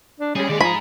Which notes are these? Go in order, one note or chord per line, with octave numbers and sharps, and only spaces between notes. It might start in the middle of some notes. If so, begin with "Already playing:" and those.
D4
G3 G#3 C#4 G#4
D#2 G#3 D5
G#2 F3 G#4 A#5 B5